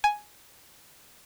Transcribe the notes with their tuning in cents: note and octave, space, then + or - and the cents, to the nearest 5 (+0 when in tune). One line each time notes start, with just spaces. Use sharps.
G#5 +5